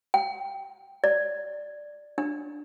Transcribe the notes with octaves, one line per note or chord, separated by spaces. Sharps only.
G5
D5
D4